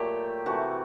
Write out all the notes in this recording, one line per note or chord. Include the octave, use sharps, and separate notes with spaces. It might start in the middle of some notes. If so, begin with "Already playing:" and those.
Already playing: A#2 F#3 A3 G4
C3 E3 A3 F#4